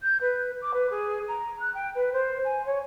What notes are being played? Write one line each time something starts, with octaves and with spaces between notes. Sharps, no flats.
G6
B4
D6
B4
G#4
A#5
F#6
G5
B4
C5
G#5
C#5